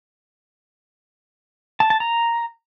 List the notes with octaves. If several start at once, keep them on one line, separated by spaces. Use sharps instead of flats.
A5
A5
A#5